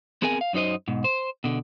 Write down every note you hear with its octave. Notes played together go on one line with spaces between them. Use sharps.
B3 C4 G#4 A#4 G#5
F5
F#2 F#3 D#4 C5 D#5
G#2 B2
C5
B2 D3